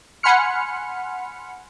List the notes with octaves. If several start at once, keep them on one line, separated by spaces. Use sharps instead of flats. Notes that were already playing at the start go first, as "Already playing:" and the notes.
F#5 G#5 B5 C6 F6 C#7